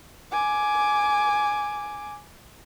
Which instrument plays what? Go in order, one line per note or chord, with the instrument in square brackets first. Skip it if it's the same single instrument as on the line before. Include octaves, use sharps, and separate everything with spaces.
[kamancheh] G#5 D6